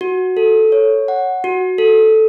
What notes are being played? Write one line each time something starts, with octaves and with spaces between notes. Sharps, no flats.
F#4
A4
C#5
F#5
F#4
A4